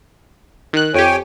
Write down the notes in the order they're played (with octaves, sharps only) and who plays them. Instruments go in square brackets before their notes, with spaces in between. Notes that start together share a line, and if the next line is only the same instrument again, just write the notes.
[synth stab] D#3 F#6
[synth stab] F2 G4 [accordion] C#5 G5 G#5